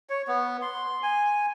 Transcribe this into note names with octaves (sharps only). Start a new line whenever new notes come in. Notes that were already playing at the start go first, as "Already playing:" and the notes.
C#5
B3
C6
G#5